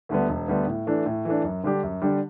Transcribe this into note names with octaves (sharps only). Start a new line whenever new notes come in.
D2 D3 G3 B3
E1
D2 D3 G3 B3
A2
E3 A3 D4
A2
E3 A3 D4
F#2
D3 G3 D4 G4
F#2
D3 G3 D4 G4